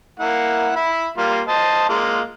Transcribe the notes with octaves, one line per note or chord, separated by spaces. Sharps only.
A#3 E4 F#5
E5 B5
G3 A#3 F4
C5 D#5 A5
G#3 A#3 F4